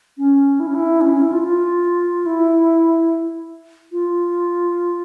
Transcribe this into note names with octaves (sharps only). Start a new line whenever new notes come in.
C#4
E4
C#4
E4
C#4
C#4
E4
F4
F4
E4
F4